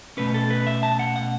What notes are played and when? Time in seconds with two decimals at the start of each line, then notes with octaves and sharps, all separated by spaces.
0.17 B2 A3 C#4 B4
0.34 A4
0.50 B4
0.67 E5
0.83 A5
0.99 F#5
1.16 F#5